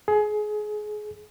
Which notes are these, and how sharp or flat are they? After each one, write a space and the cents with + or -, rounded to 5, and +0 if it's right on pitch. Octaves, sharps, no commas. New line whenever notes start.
G#4 +25